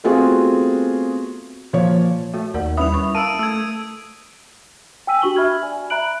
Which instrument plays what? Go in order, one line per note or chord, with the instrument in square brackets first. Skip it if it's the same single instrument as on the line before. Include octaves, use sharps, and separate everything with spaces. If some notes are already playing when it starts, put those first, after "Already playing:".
[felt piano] A3 B3 C4 F4 F#4 G#4
A#2 F3 C#5
[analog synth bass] A3 [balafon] F#4
[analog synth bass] D#2 [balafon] A#4 D5 F#5
[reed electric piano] G3 C#4 E5 [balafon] E4 B4 B5 [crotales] D#6 F7
[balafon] B5 C#6
[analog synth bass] A#3 [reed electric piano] A5 [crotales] E6 D7 D#7
[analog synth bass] A3 [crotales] E6 G#6
[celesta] G5 G#5 E6 B6 D#7
D4 F#4 G4 C#6 F#7 G7
E5 B5 F6 G#6
D5 G#5
E5 A#5 B5 F#6 D7 F#7